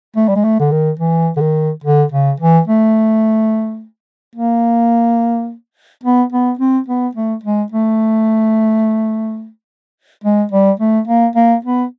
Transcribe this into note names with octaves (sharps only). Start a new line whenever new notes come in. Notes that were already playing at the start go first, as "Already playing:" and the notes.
A3
G3
G#3
A3
D3
D#3
E3
D3
D#3
D3
C#3
E3
A3
A#3
B3
B3
C4
B3
A3
G#3
A3
G#3
G3
A3
A#3
A#3
B3